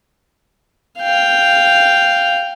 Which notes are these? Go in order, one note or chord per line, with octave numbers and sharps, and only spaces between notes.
F5 G5